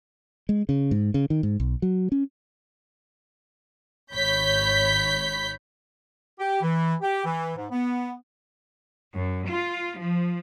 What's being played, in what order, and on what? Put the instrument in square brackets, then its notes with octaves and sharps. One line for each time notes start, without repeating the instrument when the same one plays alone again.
[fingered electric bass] G#3
C#3
G#2
C#3
D#3
G#2
B1
F#3
C#4
[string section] G#1 C#5 B5 G6 B6
[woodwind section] G4
E3
G4
E3
G#2
B3
[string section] F#2
F4
F3